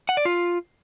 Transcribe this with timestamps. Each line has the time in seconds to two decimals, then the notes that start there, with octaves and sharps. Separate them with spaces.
0.09 F#5
0.17 D5
0.25 F4